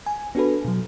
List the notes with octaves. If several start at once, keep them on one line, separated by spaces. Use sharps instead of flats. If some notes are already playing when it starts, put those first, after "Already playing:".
G#5
B3 D4 F#4 A4 B4
B2 F#3